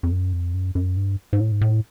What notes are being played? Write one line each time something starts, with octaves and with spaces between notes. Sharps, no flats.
F2
F#2
F2
F#2
F#2
G2
G#2
A2
G#2
A2